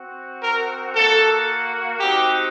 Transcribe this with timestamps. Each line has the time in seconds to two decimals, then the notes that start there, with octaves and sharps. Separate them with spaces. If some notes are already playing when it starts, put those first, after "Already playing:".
Already playing: C4 F#4
0.43 A#4
0.95 A#3 F#4 A4
2.00 C4 D#4 F#4 G4